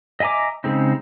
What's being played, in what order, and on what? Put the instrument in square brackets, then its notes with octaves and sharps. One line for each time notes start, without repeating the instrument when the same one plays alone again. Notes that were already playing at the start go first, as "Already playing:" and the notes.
[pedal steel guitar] D#5 E5 G#5 A#5 D6
C#3 G#3 C4 D#4